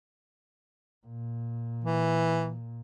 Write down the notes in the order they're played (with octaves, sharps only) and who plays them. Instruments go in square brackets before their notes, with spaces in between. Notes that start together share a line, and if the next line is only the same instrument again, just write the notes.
[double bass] A#2
[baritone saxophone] E3